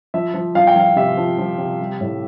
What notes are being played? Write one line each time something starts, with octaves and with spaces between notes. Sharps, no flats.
F3 E5
F3
F3 F5
G5
F3 F5
C3 E5
F3
F3
C3
G3
A2